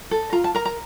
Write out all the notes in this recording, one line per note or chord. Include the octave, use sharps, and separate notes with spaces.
A4
F4 A#5
A5
A#4 A#5
A#5